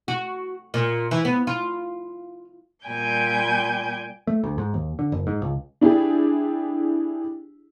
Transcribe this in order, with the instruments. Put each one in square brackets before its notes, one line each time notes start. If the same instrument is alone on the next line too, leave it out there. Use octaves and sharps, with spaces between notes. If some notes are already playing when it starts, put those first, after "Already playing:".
[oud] F#4
A#2
E3
B3
F4
[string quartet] A#2 G3 G5 G#5 G6
[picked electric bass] A3
D2
G#2
D#2
D3
F#1
G#2
C#2
[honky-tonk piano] D4 E4 G4 G#4